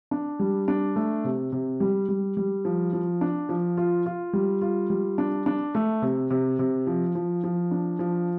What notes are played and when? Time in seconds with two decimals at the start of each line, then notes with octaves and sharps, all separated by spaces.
0.11 D4
0.39 G3
0.68 D4
0.96 A3
1.24 C3
1.52 C3
1.80 G3
2.08 G3
2.37 G3
2.65 F3
2.93 F3
3.21 D4
3.49 F3
3.77 F4
4.06 F4
4.33 G3
4.62 F4
4.90 G3
5.18 D4
5.46 D4
5.75 A3
6.02 C3
6.30 C3
6.59 C3
6.87 F3
7.15 F3
7.44 F3
7.71 D4
7.99 F3